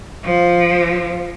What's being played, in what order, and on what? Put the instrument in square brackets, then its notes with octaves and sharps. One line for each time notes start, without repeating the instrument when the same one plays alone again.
[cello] F3